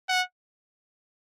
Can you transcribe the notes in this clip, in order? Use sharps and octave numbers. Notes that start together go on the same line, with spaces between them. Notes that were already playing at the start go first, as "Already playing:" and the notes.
F#5